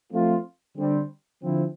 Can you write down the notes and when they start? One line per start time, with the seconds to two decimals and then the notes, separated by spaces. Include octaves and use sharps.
0.13 F3 A3 C4 F4
0.77 D3 G3 C4
1.41 D3 F3 C4 E4